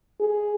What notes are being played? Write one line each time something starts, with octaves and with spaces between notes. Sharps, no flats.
G#4